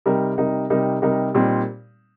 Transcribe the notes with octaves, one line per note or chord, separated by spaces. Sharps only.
C3 G3 D#4 A#4
C3 G3 D#4 A#4
C3 G3 D#4 A#4
C3 G3 D#4 A#4
A#2 G3 C4 D#4